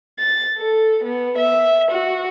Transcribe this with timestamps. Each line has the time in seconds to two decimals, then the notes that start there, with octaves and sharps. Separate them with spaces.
0.18 A6
0.57 A4
1.03 B3
1.37 E5
1.90 F#4